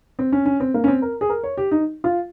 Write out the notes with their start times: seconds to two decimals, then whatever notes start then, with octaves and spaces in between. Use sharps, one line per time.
0.19 C4
0.32 C#4
0.46 C#4
0.60 C4
0.74 A#3
0.84 C#4
0.88 C4
1.02 A#4
1.21 G#4
1.29 A#4
1.43 C#5
1.57 G4
1.71 D#4
2.04 F4